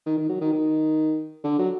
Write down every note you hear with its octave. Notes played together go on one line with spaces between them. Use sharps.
D#3
D#3
F#3
D#3
D#3
D3
F#3